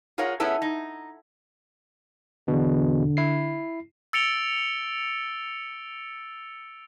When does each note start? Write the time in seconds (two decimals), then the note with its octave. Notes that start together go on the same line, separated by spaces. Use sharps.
0.18 F4 G#4 A#4 C#5 F5 F#5
0.40 B3 C#4 E4 G#4 A4
0.62 D#4
2.48 E2 B2 D3
3.17 E4 C7
4.13 E6 A6 C#7 D7 F7 G7